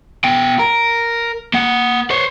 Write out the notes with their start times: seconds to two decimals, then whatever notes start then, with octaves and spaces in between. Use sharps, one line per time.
0.24 B2 G5
0.59 A#4
1.54 A#3 F#5
2.10 C5 C#5